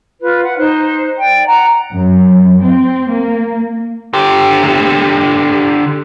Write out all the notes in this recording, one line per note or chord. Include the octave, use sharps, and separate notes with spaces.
F4 B4
F#5
D#4 C5 F#6
D5 G5
F#5 A#5
F#2
C4
A#3
D3 G4